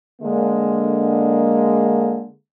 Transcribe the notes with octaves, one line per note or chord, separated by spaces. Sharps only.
D3 G#3 A#3